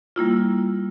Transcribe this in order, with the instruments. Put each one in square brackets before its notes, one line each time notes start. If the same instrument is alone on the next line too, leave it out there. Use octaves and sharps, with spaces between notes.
[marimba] G3 A#3 E4 F4